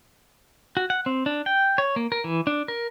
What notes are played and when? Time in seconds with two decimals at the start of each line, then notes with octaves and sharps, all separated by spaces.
0.77 F#4
0.90 F#5
1.06 C4
1.26 D4
1.46 G5
1.78 C#5
1.96 A#3
2.12 A#4
2.24 E3
2.47 D4
2.68 A#4